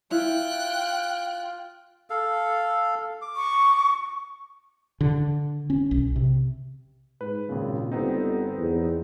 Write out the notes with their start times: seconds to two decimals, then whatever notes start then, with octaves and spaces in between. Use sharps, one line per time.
0.11 E4 F4 E5 G5 F#6
2.10 A4 F5
3.22 D6
3.36 C#6
5.01 D3
5.70 C#4
5.91 B1
6.16 C3
7.21 G#2 B4
7.49 G#1 A#2 C#3
7.92 G1 B3 C4 D#4
8.58 E2